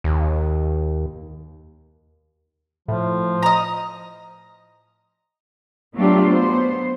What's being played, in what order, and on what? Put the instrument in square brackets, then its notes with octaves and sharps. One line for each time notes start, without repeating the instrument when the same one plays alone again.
[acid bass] D#2
[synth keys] A2 [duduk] F3
[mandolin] D#5 A#5
[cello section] F#3 A3 B3 D4 F4 G4
B3 C5